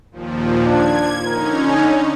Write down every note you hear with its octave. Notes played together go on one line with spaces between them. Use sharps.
D#2 A#2 F3
D4 G#6
D3 C#4 D#4 A#4
G#5